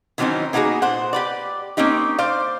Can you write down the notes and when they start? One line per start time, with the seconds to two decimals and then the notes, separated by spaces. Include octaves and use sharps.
0.18 D#3 E3 F#3 C4 C#4 D#4
0.53 A#3 B3 D#4 E4 F#4 G#4
0.82 A#2 C5 F#5
1.13 G4 B4 D5
1.77 A#3 C4 C#4 D#4 G4
2.18 C5 D5 F5